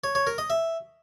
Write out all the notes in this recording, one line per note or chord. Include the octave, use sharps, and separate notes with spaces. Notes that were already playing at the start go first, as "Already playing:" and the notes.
C#5
C#5
A#4
D#5
E5